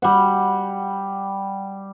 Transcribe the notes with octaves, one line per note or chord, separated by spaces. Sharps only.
G3 F#5